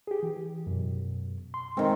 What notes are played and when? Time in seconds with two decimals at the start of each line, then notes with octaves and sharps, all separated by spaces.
0.07 G4 G#4
0.23 E3
0.67 F#2 B2
1.54 C6
1.77 D#3 G#3 C4